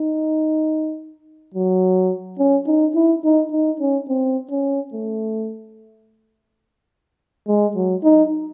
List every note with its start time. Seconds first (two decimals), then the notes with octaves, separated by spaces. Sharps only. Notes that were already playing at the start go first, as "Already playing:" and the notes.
Already playing: D#4
1.54 F#3
2.39 C#4
2.67 D#4
2.95 E4
3.24 D#4
3.52 D#4
3.80 C#4
4.08 C4
4.51 C#4
4.93 A3
7.48 G#3
7.76 F#3
8.04 D#4